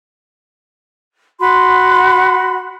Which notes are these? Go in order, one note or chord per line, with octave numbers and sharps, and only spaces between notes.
F#4 B5 C6